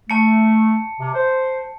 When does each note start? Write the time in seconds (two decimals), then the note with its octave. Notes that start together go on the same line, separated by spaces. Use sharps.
0.10 A3 A5 C#7
1.00 C3
1.14 C5